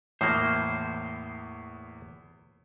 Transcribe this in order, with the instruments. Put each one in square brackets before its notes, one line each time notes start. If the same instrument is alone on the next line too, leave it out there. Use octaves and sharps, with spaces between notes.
[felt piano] E2 C#5 D#6 [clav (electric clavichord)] A2 A#3 [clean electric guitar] C5